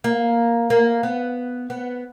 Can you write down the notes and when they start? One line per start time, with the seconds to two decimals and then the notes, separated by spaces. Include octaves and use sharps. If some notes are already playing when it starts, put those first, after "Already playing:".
0.04 A#3
0.70 A#3
1.03 B3
1.70 B3